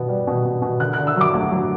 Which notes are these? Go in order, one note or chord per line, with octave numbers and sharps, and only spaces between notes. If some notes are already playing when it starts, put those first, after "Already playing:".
Already playing: B2 B3
G3
B2
B2
B2
D3 F#6
D3 F#6
E6
F#3 D6
D2
F#3